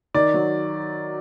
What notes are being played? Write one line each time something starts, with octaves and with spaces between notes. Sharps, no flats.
D#3 D5
F#3